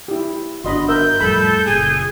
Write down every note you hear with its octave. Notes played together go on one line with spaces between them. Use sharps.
E4 G4
G1 C#3 D4 F#4 D#5 B5 C6
A#4 E5 E6 G6
F2 A2 G3 A4 B5
F#1 A#2 G#4